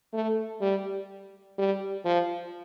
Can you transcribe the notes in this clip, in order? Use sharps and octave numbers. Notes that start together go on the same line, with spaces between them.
A3
G3
G3
F3